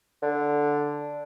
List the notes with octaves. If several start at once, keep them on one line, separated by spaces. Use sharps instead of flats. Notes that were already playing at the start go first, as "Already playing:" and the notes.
D3